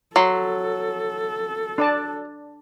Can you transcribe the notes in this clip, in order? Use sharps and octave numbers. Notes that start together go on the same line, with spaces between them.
F#3 A4 C6
D4 D5 A5